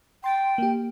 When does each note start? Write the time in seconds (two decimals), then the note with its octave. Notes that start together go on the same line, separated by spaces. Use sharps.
0.24 G5 C6 A6
0.58 A#3 G4